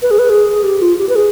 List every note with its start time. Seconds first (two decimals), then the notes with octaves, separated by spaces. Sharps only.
0.02 B4
0.11 G#4
0.19 B4
0.29 G#4
0.63 G4
0.82 F4
0.98 G4
1.09 B4
1.15 G#4